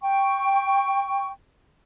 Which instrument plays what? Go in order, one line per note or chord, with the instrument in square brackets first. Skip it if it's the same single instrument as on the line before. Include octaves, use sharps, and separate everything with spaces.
[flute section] G5 C#6